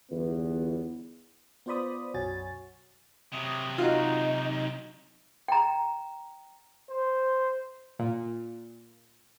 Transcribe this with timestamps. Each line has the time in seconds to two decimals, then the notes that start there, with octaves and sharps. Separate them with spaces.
0.11 G1 E2 B3
1.66 B3 F4 C5 D5 B5 D#6
2.14 B1 F#2 F#4 C#5 G#5 A6
3.33 C3 F#3 D#6
3.78 D#4 F4 F#4
5.48 G5 A#5
6.89 C5
7.99 A#2